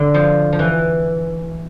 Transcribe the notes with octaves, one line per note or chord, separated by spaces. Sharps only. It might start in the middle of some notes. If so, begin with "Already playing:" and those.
Already playing: D3
F3
F3
E3